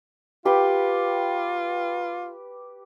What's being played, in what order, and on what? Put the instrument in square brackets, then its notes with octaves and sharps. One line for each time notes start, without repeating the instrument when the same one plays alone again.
[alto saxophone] F4 [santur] G4 B4 G5